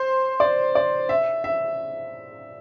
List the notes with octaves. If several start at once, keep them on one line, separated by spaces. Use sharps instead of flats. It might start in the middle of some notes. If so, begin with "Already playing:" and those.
Already playing: C5
D5
D5
E5
E5